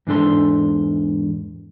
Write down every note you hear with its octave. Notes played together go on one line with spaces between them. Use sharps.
E2 G#2 D4 A4 C6